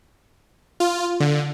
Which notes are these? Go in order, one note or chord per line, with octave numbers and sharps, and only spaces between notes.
F4
D3